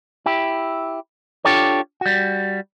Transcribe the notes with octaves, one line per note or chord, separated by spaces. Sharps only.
E4 G4
D4 F4 G4 A4 C#5
G3 F#4